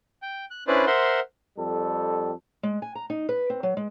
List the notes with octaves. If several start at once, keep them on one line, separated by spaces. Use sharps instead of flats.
G5
F#6
C#4 D4 E4 B4 C5 D5
A#4 C5 E5 F#5 C6
F2 G3 A4
G#3
G#5
A#5
D#4
B4
C4
F#3
G#3